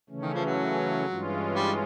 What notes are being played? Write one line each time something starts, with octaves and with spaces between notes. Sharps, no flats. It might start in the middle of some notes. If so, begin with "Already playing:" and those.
C#3 E3 A3 C#4
D#3
F3
F#3
G2 E3 G#3 C#4 F4
G3